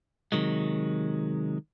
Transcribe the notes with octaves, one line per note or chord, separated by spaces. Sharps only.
C3 D#3 F#3 G#3